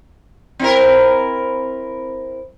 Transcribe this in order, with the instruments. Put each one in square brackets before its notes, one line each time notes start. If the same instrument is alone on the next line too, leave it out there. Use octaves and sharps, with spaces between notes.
[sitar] C4 E4 A#4